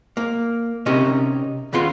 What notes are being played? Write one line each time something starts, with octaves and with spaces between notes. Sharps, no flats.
A#3
C3 C#4 D#4 G4 A#4
D#2 C#3 B3 F4 C6